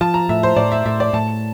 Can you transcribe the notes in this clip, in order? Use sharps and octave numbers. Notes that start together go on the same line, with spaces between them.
F3 A5
A#5
A2 E5
C5
A2 D5
E5
A2 E5
D5
A2 A5